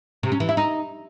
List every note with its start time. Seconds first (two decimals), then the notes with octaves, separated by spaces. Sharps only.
0.23 C3
0.32 C#4
0.40 E3
0.49 E4
0.57 D#4